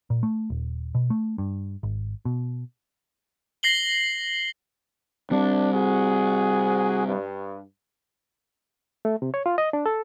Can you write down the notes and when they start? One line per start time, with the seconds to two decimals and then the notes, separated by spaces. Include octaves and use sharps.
0.10 A#2
0.23 A3
0.50 D#1
0.95 B2
1.10 A3
1.38 G2
1.83 G#1
2.25 B2
3.63 A#6 C7 F#7 G7
5.31 G3 C4 D4
5.73 F#4 G#4
7.07 G2
9.05 A3
9.22 C3
9.34 C#5
9.46 F4
9.58 D#5
9.73 D4
9.86 A4